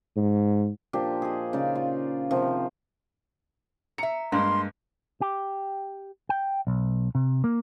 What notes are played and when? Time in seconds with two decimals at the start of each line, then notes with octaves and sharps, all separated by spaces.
0.17 G#2
0.93 A#2 F3 D4 G4
1.22 G#4 D#5
1.53 C#3 D#4 D5 F5
1.75 F4
2.31 C3 D#3 F3
3.98 E5 A#5 C#7
4.32 G2 G#3 A#3 C6
5.21 G4
6.29 G5
6.67 B1
7.15 C3
7.44 A#3